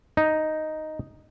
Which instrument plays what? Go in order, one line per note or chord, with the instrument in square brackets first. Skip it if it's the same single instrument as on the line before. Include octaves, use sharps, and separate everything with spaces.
[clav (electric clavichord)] D#4